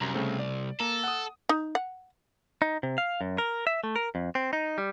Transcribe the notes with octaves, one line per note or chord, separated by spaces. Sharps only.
C2 F#2 A#5
C#3 A3 C4
D5
A#3 A4 A#5
F#5 D#6
D#4
F#5
D#4
C3
F5
F#2
A#4
E5
A3
A#4
F2
C4
D#4
G3